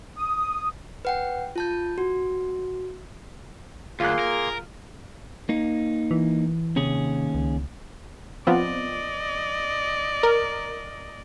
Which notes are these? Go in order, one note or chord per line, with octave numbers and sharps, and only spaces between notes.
D#6
B4 F#5 G5
F4 A5 G6
F#4
D2 A#3 F4 G#4 C6 F#6
A#4
A#3 D#4
E3
D#2 C3 C#4 G#4
C#2
F3 B3 C4 D5 D#5
A#4